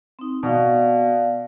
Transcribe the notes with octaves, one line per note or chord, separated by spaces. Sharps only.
C4 D#4
B2 D5 F5